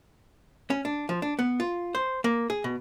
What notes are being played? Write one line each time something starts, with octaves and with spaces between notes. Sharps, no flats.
C#4
D4
F3
D4
B3
F4
C5
A#3
G#4
B2